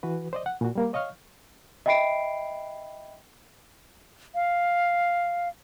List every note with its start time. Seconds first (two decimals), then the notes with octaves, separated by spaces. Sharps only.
0.03 E3 F#4 B4
0.33 C5 D5 D#5
0.46 F#5
0.61 A#2 F#4
0.75 G3 A#3 A#4
0.93 C#5 D#5 F5 C#6 F6
1.86 D#5 E5 G5 B5 C7 D7
4.35 F5